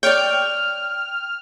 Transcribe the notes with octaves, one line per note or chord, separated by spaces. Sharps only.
C#5 D5 G5 F6